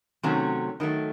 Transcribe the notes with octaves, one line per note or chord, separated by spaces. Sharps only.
C3 D#3 F#3 A3 C#4
D#3 F#3 A3